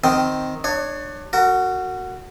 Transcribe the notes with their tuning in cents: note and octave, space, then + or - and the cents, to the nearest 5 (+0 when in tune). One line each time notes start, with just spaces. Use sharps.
D#3 +0 C4 -5 G5 +0
D4 +30 C#5 +0
F#4 +0 A#4 -35